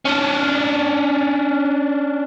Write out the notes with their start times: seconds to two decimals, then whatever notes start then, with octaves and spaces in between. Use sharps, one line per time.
0.06 C#4 D4